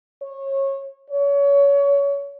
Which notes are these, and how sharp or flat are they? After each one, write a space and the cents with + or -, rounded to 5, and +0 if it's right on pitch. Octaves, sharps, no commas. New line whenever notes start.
C#5 -25
C#5 +25